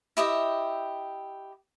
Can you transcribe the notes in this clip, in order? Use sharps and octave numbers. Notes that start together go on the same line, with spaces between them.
E4 G4 D#5 E5